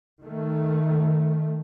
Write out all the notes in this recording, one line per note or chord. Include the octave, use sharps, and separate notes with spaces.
D#3 A3